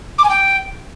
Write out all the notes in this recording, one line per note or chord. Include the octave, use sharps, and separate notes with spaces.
D6
G#5
G5